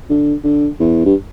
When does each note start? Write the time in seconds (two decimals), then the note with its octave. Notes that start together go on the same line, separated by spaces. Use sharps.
0.10 D3
0.44 D3
0.80 E2
1.05 G2